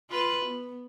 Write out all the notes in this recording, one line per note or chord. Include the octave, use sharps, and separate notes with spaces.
F4 B4
B3